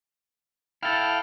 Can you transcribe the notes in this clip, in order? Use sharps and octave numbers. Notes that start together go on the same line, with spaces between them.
E4 A4 F5 G5 F6